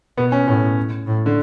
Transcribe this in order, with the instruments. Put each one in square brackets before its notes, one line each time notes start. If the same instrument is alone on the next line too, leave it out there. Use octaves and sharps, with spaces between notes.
[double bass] B2 [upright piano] B3
[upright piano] C#4
[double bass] A2 [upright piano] C#4
[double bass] A2
[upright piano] D3